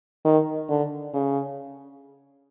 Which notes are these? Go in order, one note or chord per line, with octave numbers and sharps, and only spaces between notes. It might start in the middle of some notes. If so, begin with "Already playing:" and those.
D#3
D3
C#3